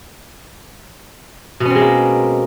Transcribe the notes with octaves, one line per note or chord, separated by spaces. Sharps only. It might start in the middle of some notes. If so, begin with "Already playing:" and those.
B2 G#3 A#3 C4 C#4